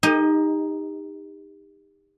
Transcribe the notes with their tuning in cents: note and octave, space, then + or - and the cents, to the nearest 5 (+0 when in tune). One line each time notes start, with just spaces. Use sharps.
D#4 +0 G4 +35 D#5 +20